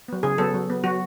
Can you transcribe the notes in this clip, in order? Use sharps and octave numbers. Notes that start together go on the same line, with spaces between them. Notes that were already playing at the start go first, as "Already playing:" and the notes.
F#3 B3
C#3 G#4
F#3 B3 A4
F#3
B3
F#3 F#4